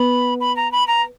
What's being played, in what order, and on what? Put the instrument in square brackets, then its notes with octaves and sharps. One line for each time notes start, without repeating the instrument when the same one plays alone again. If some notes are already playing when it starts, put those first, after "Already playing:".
Already playing: [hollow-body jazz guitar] B3 [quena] B5
[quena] B5
A#5
B5
A#5